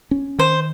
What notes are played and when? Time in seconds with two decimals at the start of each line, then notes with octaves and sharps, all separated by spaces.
0.11 C#4
0.39 D#3 C5